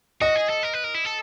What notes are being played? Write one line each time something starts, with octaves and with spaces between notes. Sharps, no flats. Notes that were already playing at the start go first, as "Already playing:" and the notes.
F#4 D#5
G#4
A4
A#4
B4
A#4
E4
A4